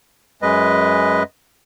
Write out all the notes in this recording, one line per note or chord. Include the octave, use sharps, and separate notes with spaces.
F#2 G#3 B4 D#5